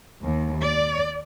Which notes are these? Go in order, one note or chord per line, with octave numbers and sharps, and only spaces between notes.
D#2
D5